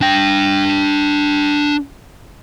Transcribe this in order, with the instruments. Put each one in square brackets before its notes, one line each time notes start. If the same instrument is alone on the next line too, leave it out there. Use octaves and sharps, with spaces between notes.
[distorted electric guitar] D4 G5